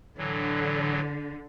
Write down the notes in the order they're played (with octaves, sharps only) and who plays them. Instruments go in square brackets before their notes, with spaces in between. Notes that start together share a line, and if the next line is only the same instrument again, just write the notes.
[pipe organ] A2 E3 F#3 [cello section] D3